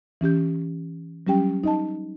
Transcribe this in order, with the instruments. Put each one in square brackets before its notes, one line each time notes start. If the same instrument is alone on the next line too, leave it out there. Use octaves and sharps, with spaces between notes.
[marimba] E3 C#4 G4 G6
F#3 G3 C#4 G4 G5
D#4 D#5 A5